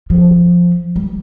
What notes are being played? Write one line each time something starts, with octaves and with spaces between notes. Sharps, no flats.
F3
G3